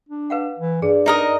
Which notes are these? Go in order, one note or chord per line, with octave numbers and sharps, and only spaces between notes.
D4
B4 F5 F#5
E3
G2 G#4 D5
D#4 A#4 D#5